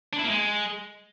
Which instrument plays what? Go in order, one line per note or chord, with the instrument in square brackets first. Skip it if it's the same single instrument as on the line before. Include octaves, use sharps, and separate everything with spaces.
[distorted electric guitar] D4
E4
A#3
G#3